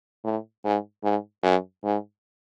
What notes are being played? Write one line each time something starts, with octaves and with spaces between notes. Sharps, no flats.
A2
G#2
G#2
F#2
G#2